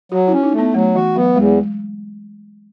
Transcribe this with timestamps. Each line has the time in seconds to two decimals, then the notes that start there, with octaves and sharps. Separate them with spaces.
0.12 F#3 F#4
0.28 C#4 E4
0.43 D#4
0.53 A3
0.59 B3
0.74 F#3 A3
0.95 E3 F#4
1.16 F#3 B3
1.36 E2 G#3